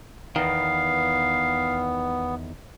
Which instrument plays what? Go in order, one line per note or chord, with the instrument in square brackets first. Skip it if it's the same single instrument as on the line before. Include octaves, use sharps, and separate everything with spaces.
[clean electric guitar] E2 D#3 [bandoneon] B3 [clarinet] F5